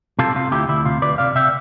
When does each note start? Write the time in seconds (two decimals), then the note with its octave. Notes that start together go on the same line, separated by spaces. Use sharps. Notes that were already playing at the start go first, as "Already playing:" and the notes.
0.19 C3 F4 A4
0.36 C3 F4
0.52 D2 E4 G4
0.69 D2 E4
0.85 C3 F4
1.02 D2 B4 D5
1.18 C3 D5 F5
1.35 C3 E5 G5